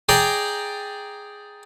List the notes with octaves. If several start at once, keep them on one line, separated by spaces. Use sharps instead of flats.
G#4 D5 G5 A#5